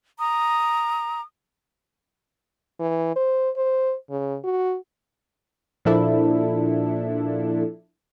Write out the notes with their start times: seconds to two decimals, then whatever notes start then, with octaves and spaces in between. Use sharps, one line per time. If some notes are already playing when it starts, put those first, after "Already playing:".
0.19 A#5 D#6
2.80 E3
3.16 C5
3.57 C5
4.10 C#3
4.44 F#4
5.85 A#2 F3 D4 E4 A4